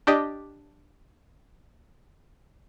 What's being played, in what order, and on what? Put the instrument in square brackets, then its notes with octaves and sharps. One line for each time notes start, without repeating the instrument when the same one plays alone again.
[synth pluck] D4 G4 D5 D#5